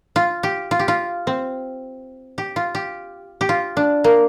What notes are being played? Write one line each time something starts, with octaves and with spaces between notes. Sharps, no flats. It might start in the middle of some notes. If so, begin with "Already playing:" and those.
F4
G4
F4
G4
F4
C4
G4
F4
G4
G4
F4
D4
A#3